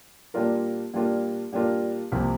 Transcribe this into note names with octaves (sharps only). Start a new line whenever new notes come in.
A#2 G3 D4 F4 A#4
A#2 G3 D4 F4 A#4
A#2 G3 D4 F4 A#4
C2 C3 F3 A#3